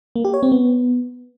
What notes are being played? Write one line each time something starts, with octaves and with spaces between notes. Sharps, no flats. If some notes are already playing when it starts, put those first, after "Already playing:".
A#3
G4
C#5
C4
B3